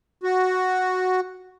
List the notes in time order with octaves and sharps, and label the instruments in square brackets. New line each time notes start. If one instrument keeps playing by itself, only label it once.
[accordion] F#4